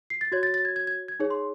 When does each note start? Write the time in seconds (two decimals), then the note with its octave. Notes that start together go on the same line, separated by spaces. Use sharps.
0.10 C7
0.21 A6
0.32 F#4 C#5 G#6
0.43 A6
0.54 A6
0.65 G#6
0.76 G#6
0.87 G#6
1.08 G#6
1.20 D#4 G#4 C#5
1.30 C6